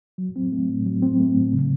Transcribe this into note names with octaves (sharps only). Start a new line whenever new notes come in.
F#3
C4
A3
A2
F#3
C4
A3
A2
C#3